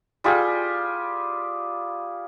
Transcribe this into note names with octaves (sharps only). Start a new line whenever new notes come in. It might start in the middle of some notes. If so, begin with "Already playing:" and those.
G3 F4 G4 G#4